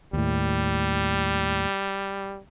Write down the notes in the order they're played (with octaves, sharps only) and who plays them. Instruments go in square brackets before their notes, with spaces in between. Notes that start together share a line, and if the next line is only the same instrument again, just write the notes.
[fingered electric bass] D#2 A2 [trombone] G3